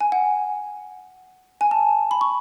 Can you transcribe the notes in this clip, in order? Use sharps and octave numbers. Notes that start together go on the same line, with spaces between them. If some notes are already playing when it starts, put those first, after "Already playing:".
G#5
F#5
G#5
A5
B5
C#6